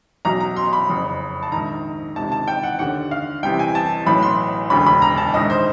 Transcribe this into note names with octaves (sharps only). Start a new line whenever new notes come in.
B1 B2 A#5
A#5
C6
B5
F#1 F2 C#3
A5
A#1 G#2 D#3 A#5
C#2 C3 D#3 A5
A5
G5
F#5
D#2 D3 F#5
F5
C2 C3 E3 G5
G#5
A5
B1 A2 E3 B5
C6
E1 D2 C#3 B5
B5
A#5
A5
A#1 G#2 D#3 D#5
C5